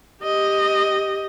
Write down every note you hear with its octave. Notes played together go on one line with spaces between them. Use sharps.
G4 D#5